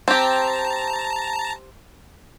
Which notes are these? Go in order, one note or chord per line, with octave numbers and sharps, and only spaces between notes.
C4 G4 A5 A#5